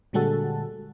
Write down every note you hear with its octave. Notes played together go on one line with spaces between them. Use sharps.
A#2 D3 G3 G#3 F#4 A4